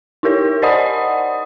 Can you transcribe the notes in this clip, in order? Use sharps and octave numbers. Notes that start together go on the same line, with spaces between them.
D#4 E4 G4 A#4 C#5
C5 D5 D#5 F#5 B5 D#6